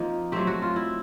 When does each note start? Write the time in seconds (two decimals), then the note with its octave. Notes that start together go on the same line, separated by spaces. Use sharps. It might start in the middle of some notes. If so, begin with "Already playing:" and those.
Already playing: F3 A#3 C4 D#4
0.32 F#3 A3 C4 G4
0.47 F#4
0.62 F4
0.76 E4